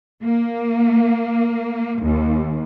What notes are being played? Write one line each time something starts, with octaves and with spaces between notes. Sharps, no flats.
A#3
D#2